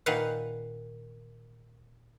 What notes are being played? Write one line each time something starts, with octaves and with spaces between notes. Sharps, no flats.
A#2 D#3 F#4 B4 F5 F#5